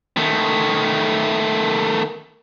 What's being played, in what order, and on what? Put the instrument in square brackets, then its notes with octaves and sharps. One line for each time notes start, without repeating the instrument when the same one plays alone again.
[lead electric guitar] D#3 A3